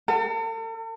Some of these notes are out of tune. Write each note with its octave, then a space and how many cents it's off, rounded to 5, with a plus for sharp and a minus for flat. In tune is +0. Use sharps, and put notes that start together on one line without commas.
A4 +45